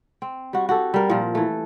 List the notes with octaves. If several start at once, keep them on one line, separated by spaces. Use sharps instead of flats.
C4
G3 F#4
F#4 G4 A4
G3 A#4
A#2 F3 A#4
E3 A3